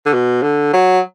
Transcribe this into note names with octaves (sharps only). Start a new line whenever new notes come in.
D3
B2
D3
F#3